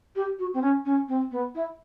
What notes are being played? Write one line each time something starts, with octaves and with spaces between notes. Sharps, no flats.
G4
F#4
C4
C#4
C#4
C4
B3
E4